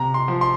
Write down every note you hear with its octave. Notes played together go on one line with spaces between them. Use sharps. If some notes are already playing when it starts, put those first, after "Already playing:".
Already playing: C3 A#5
C6
F3
C6